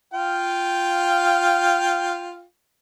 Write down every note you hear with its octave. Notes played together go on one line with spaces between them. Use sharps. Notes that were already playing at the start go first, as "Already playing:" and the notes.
F4 F5 G5